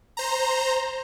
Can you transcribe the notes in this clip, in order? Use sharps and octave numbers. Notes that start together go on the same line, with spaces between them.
C5 A#5